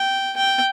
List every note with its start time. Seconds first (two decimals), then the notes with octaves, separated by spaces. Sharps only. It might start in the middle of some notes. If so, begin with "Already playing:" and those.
Already playing: G5
0.36 G5